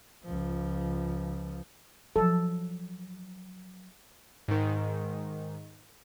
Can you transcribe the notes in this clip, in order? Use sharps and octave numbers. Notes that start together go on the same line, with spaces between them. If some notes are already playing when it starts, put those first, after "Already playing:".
C#2 F3
F3 F#3 A4
G#2 D#3